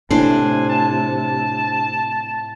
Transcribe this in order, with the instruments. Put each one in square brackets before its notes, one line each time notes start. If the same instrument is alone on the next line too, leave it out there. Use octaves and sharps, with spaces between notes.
[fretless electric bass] A2 [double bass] C3 [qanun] D4 C5 [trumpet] G#5
[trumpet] A5